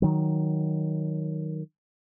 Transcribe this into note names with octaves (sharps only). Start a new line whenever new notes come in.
D#3 F#3